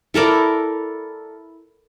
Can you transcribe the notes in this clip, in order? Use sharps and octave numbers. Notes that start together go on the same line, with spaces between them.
E4 A4 A#4 D5